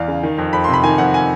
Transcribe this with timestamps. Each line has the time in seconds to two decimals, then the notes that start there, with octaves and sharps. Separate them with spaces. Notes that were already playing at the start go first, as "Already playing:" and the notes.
Already playing: E2 D5 F5
0.08 C#3
0.23 D#3
0.38 F2
0.53 F2 B5
0.64 C6
0.68 C3
0.73 B5
0.84 D#3 G#5
0.98 F2 F#5
1.14 G#5